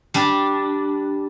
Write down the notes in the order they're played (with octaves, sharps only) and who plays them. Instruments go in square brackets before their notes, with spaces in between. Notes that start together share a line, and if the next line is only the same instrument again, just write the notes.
[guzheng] G3 D4